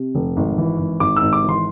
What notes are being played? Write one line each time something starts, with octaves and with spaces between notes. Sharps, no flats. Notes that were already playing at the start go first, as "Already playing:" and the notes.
Already playing: C3
F1
G#1
E3
G#1
G#1 D6
G#1 E6
D6
E3
C6